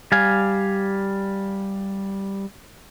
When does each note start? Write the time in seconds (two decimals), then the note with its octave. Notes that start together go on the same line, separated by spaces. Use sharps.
0.12 G3 F5 G#5